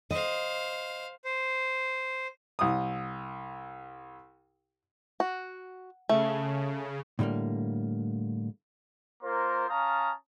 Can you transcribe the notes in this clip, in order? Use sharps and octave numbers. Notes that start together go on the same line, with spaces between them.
C5 D#5 F5
C5
C2 D#6
F#4
C#3 A3
A2 D3 G3 G#3 A#3
A#3 F4 A#4 C5
C#4 F5 A5 A#5 D#6